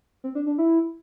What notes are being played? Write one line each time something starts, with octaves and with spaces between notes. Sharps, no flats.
C4
D4
D4
E4